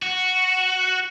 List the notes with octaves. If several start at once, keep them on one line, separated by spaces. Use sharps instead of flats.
F#4